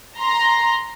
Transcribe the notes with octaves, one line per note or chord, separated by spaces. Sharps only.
A#5 C6